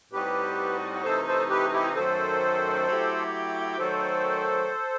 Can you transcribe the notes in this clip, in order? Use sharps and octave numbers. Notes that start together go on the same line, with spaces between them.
A2 G3 C4 D#4 F#4 G4 B4
C3 E3 A3 D#4 A4 C5
A4 C5
G4 B4
E4 G4
F#2 D#3 A3 A4 C5
F#3 A3 E4 G4
D#3 F#3 A3 A4 C5